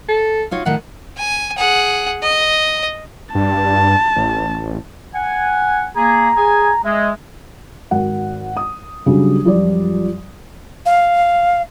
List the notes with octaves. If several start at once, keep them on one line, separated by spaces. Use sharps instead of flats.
A4
D#4 F4 F#4 C#5
A2 D#3 F4 F#5
G#5
G#4 F#5
D#5
G2 A5
A1
F#5 G#5
A#3 G#4 A#5
G#4 G#5
G#3 E5
G#1 F#4 A#4 F#5
D#6
C#3 F#3 G3 D4
F#2 F3 G3 F4 D5
F5